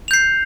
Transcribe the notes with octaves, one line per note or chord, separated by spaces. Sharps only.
G6 C7 F7